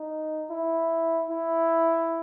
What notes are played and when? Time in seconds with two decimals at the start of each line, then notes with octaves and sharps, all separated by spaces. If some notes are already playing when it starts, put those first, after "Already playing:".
Already playing: D#4
0.50 E4
1.30 E4